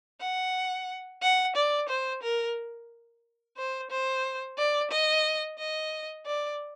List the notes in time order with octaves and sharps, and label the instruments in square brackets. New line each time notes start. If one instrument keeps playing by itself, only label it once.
[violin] F#5
F#5
D5
C5
A#4
C5
C5
D5
D#5
D#5
D5